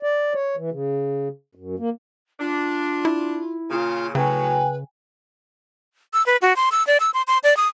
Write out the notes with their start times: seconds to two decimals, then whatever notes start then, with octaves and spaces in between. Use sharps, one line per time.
0.03 D5
0.34 C#5
0.57 E3
0.72 C#3
1.55 F#2
1.79 A#3
2.39 D4 F4
3.05 E4
3.69 A#2 C#3 F4
4.15 A2 C#3 F#3 B4 G5 G#5
6.13 E6
6.26 B4
6.42 F#4
6.56 C6
6.72 E6
6.87 D5
7.00 E6
7.14 C6
7.27 C6
7.44 D5
7.57 D#6